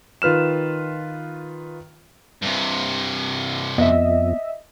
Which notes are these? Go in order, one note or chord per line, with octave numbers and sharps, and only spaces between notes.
D#3 F4 B4 F6 E7
G2 C3
F2 B3 D#5 E5